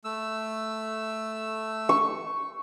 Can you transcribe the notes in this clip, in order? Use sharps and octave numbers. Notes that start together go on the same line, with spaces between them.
A3 E6
C#6